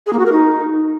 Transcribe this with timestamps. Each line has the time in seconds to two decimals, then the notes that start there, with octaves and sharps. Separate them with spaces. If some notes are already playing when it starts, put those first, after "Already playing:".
0.06 G#4
0.13 A#3
0.19 F#4
0.26 A#4
0.32 D#4